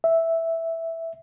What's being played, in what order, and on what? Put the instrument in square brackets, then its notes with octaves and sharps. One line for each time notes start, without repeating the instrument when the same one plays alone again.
[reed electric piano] E5